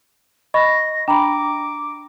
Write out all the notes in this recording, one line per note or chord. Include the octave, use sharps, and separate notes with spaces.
D#5 B5 C#6 A#6
D4 G5 A#5 B5 D6